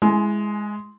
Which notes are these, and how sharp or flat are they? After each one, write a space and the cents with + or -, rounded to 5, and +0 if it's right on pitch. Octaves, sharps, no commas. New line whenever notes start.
G#3 +0 E4 +0 G#5 +30